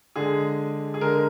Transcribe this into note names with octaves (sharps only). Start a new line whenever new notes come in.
D3 G#3 G#4
G#4
D3 G#3 A#4